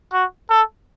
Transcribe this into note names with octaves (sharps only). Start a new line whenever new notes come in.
F#4
A4